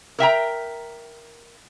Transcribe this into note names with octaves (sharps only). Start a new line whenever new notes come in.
A#4 E5 G5 A#5